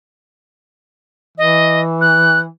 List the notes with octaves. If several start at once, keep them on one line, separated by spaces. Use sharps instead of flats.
E3 D#5
F#6